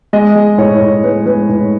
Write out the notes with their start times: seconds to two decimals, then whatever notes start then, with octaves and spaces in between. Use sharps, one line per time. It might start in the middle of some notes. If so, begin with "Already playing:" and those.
0.13 G#3 D#5
0.35 G#3
0.58 A2 C#5
0.81 A2
1.03 G#3 B4
1.26 G#3 B4
1.49 A2